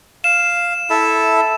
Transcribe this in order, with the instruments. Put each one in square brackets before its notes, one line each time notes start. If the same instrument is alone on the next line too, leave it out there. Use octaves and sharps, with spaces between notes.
[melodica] F5 [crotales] E7
[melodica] E4 A4 E5